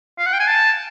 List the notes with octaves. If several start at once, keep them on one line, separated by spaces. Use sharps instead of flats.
F5
F#5
G5
G#5
A5